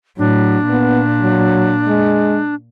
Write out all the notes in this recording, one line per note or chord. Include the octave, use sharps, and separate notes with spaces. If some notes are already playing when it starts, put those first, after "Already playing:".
A2 F#3 D4
A#2 B3
F#3
G#3